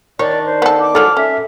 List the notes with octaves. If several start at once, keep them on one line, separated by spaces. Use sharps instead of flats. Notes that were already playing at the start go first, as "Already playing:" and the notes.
D#3 D4 C#5 D5
C5
B3 A4
D6
F3 F#3 G#3 A4 F6
C#4 E5